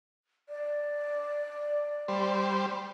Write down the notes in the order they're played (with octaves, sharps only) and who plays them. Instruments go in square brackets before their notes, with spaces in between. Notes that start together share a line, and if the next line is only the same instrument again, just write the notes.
[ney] D5
[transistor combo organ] G3 C5